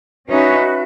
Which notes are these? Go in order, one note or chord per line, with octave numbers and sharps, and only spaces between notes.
C#4 D#4 F#4 B4 E5